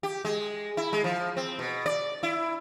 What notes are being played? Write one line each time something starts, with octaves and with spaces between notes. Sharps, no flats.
G4
G#3
E4
G#3
F3
C4
B2
D5
E4